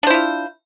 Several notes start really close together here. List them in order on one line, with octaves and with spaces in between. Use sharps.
D4 C5 E4 F4